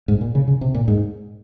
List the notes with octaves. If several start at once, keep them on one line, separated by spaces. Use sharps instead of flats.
G#2
A#2
C#3
C#3
C3
A#2
G#2